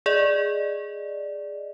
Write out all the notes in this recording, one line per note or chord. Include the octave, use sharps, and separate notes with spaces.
G#4 D5 D#5